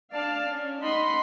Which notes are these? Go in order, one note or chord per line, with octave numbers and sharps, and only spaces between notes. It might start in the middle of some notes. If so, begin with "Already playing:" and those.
D4 D5 F5 A5
C#4
D#4 D#5 F#5 B5 C6